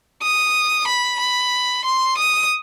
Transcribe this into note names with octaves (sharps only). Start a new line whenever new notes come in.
D#6
B5
B5
C6
D#6